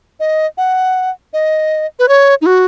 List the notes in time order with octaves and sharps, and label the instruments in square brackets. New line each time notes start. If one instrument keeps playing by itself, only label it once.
[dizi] D#5
F#5
D#5
B4
C#5
D#4
F#4